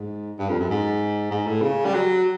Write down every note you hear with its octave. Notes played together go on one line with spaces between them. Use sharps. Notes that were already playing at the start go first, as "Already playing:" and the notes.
Already playing: G#2
G2
F2
F#2
G#2
G#2
A2
C#3
G3
F#3